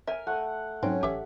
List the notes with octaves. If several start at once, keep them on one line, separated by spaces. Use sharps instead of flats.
A#4 E5 G#5
A3 F#5
G#2 F#3 C4 C#4
A1 G4 A4 E5